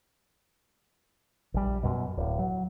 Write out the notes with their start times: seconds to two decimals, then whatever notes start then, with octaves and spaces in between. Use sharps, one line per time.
1.54 A#1 G3
1.83 F#2 B2
2.17 D1
2.39 F#3